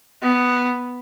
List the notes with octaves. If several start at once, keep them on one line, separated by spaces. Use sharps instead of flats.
B3